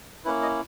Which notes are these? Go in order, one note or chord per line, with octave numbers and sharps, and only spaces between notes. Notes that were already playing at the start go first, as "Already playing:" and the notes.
A#3 C#4 E4 B4
D#5